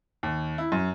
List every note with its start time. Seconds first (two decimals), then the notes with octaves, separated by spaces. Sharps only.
0.23 D#2
0.58 E4
0.72 F#2